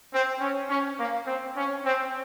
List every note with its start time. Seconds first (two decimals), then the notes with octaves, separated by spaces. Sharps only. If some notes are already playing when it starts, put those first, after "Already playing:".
0.12 C4
0.41 C#4
0.70 C#4
0.98 A#3
1.26 C4
1.55 C#4
1.84 C4